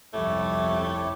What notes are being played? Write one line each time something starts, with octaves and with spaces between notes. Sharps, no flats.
G1 C2 F2 A3 E4 G4 C#5